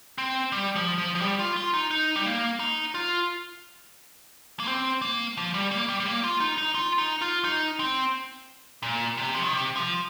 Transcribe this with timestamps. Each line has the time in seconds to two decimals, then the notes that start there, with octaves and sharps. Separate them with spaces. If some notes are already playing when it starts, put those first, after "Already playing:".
0.18 C4
0.52 G3
0.76 F3
0.98 F3
1.15 F3
1.21 G3
1.39 F4
1.56 F4
1.74 D#4
1.91 D#4
2.16 G3
2.25 A#3
2.60 D#4
2.95 F4
4.60 A#3
4.67 C4
5.02 A#3
5.37 F3
5.54 G3
5.71 A#3
5.89 G3
6.00 G3
6.06 A#3
6.24 F4
6.40 D#4
6.58 D#4
6.75 F4
6.98 D#4
7.21 F4
7.44 D#4
7.79 C4
8.83 A#2
9.17 C3
9.34 F3
9.43 D#3
9.52 C3
9.76 F3